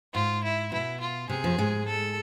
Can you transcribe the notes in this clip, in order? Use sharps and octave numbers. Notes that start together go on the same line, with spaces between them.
G#2 F4
E4
B2 E4
F4
C3 G#4
F2 F3
G#2 G#3
A4